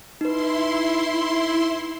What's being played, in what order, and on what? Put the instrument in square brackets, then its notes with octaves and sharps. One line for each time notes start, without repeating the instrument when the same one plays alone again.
[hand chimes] D#4 B4 [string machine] E4 C6